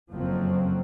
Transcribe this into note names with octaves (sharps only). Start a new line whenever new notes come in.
F#1 F2 F3 F#3 C4